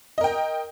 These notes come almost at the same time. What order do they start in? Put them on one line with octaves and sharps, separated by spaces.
D#5 A#4 G5